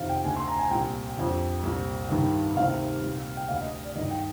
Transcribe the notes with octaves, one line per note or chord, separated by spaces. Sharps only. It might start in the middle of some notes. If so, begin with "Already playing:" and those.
Already playing: F2 C3 D#3 F5
G5
D2 D3 G#5
C6
A#5
G#5
C2 A#2 G5
F2 D3
C2 A#2
G2 D#3
D2 C3 D#3 F5
C2 A#2
G5
D2 D3 F5
D#5
D5
G2 D#3 D#5
G5